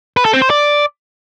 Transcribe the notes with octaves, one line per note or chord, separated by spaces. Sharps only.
B4
A4
C4
C5
D5